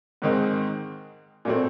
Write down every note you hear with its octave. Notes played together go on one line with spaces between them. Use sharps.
G#2 D#3 G#3 C4
A#2 F#3 A3 C4